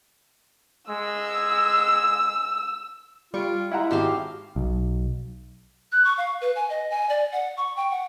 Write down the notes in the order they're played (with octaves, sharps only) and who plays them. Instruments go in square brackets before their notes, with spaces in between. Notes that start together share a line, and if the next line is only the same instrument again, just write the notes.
[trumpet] G#3 [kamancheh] E6
[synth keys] G3 D7 [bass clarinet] F4 [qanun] C#6
[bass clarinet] G#3 [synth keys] E4 [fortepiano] F5 F#5 A#5
[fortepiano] G#1 G#2 F#4 [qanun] G4 C5 F5
[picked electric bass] B1
[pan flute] F#6
C#6
F5
B4
G#5
D#5
G#5
D5
F#5
C#6
G5
F#5